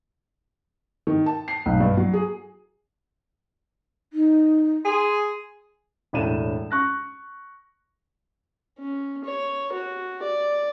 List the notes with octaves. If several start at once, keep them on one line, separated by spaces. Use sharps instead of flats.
D#3
A5
C7
B1
G2
F#3
G#4
D#4
G#4 C6
E1 A2 D4 D#7 E7
C#6 F#6 A#6
C#4
C#5
F#4
D5